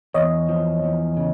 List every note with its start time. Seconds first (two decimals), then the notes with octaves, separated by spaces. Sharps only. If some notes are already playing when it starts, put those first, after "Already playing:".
0.14 E2 C#5 D#5
0.49 F3
0.84 E2
1.17 C#3